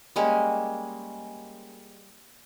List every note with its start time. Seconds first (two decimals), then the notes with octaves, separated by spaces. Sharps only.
0.16 G3 G#3 A#3 C#4